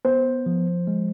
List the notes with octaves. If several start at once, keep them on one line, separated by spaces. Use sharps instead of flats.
B3 C5
F3
G#3